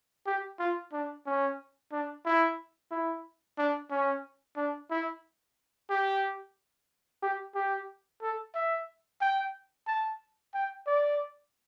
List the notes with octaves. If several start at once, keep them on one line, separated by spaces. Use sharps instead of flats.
G4
F4
D4
C#4
D4
E4
E4
D4
C#4
D4
E4
G4
G4
G4
A4
E5
G5
A5
G5
D5